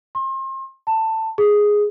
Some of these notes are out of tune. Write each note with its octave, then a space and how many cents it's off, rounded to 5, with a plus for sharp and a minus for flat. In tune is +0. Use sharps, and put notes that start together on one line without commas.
C6 +35
A5 +15
G#4 +0